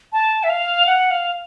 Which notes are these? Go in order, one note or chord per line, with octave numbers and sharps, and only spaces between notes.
A5
E5
F5
F#5
F5